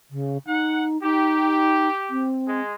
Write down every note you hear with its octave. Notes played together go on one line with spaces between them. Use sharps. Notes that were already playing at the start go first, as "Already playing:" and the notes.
C#3
D#4 F#5
D#4 G4
C4
G#3